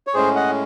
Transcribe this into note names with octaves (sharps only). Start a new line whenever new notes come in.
C#5
A2 G#3 C#4 G#4 C5
D#5 F#5